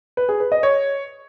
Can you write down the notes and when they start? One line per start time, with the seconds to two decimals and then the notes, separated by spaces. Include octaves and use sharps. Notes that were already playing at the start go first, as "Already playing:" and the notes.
0.17 B4
0.29 G#4
0.40 B4
0.52 D#5
0.63 C#5